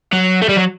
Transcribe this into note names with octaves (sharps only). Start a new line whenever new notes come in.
F#3
A3
G3
F#3